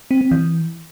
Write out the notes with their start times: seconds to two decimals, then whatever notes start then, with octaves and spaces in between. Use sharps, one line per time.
0.11 C4
0.21 C4
0.31 E3